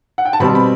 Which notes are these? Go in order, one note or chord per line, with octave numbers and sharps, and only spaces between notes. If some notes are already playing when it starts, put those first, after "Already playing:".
F#5
G5
A5
B2 G3 C4 B5
B5